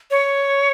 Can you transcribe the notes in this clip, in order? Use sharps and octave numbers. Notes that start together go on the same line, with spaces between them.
C#5